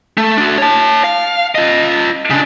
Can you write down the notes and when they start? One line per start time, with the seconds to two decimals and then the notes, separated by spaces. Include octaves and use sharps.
0.17 A3
0.37 D4 F#4
0.58 C#5 A5
1.04 F5
1.55 F4 D#5
2.30 C#3 D4